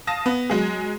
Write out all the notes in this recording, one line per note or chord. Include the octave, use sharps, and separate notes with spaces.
F5 A5 D#6 A#6
B3
F#3 G#3 G#4